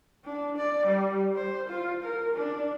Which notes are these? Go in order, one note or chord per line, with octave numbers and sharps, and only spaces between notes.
D4
D5
G3
C5
F4
A#4
D4